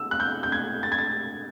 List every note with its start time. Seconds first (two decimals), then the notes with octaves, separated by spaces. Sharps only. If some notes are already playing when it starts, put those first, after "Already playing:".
Already playing: E6
0.11 F#6
0.20 G6
0.43 G6
0.52 G#6
0.83 A6
0.92 G#6
0.98 A6